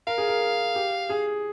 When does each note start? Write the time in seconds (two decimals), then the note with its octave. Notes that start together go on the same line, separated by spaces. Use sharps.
0.07 A#4 F5
0.18 G#4
0.28 A#4
0.75 G4
1.10 G#4